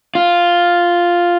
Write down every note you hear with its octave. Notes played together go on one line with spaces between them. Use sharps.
F4